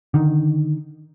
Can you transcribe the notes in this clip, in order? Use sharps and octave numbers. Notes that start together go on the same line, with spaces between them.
D3 D#3